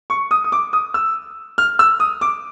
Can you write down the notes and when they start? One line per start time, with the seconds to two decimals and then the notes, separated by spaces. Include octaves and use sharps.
0.10 C#6
0.31 D#6
0.44 D#6
0.52 D6
0.73 D#6
0.94 E6
1.58 F6
1.79 E6
2.00 D#6
2.21 D6